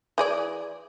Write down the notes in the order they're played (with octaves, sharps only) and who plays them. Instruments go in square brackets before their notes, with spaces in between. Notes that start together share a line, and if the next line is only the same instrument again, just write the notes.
[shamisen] E3 G#4 D5